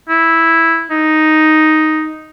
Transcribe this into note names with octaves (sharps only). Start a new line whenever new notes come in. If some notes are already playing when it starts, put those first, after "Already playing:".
E4
D#4